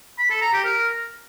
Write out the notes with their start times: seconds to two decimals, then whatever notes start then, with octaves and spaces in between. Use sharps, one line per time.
0.19 B5
0.30 A4
0.42 A#5
0.53 G4
0.65 A#4